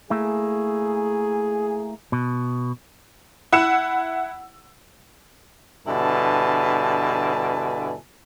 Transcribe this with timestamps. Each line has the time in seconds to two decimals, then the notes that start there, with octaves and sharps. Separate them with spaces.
0.10 A3 A#3 E4 G#4
2.12 B2
3.52 E4 F#5 E6 C#7 E7
5.87 G2 B2 D3 E4 G#5 A5